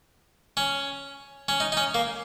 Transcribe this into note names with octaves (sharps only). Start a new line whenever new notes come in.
C#4
C#4
D#4
D#4
C#4
A#3